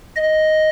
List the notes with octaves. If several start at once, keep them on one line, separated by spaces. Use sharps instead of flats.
D#5